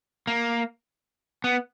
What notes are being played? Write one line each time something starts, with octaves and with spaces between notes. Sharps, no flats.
A#3
B3